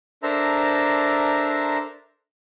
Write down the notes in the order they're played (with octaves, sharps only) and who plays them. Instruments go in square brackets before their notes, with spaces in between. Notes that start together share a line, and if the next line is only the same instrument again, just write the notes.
[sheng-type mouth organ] D4 A4 A#4 C5 E5 A#5